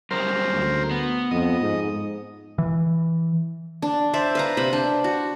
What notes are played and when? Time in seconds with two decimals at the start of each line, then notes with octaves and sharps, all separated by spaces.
0.11 F#2 C#3 G3 A#4 C5
0.53 D2
0.91 B3
1.31 F2 D#5
1.61 G#2
2.58 E3
3.82 D4
4.14 C5 D5 E5
4.35 B4 F5 A#5
4.57 C3 C5 B5
4.73 D4
5.04 F#4